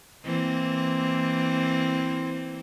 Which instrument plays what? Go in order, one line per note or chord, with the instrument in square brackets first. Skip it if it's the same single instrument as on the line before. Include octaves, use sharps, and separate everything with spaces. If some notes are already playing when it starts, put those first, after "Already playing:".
[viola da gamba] E3 A#3 C4